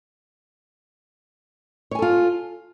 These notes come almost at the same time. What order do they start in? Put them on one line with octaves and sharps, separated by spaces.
C#5 G#5 A4 F4